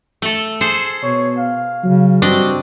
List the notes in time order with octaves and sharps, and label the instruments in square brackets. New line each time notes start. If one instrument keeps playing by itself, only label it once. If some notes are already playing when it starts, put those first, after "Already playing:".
[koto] A3 A4
G#4 A4 C5
[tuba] B2 [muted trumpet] C#5
[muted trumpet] F5
[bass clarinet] C#3 [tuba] F#3
[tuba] G2 [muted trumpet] C4 [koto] D4 D5 D#5 [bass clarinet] F#4